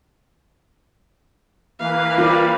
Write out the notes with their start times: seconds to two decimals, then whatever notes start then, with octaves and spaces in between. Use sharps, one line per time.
1.79 E3 A#3 B4 F5
2.18 G3 F4 A#4 C5